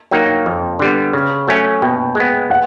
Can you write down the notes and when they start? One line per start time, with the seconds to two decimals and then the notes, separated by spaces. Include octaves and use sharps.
0.11 F#3 A#3 D#4 G5
0.46 F2
0.79 D3 G3 B3
1.13 C#3
1.47 F#3 A3 C#4
1.82 B2 G5
2.15 G#3 B3
2.50 F#5